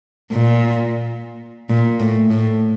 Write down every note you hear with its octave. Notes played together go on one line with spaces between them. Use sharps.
A#2
A#2
A2
A2